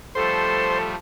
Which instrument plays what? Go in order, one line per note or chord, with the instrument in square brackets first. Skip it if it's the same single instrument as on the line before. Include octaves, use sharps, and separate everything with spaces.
[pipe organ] F3 G3 A3 [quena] A4 [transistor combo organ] C5